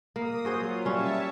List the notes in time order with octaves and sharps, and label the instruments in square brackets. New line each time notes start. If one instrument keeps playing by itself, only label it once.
[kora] A#3 [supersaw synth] D#6
[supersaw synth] F#3 F4 [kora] F#4 G#4 C5
[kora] G3 C#4 [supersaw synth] C#5 E5 A5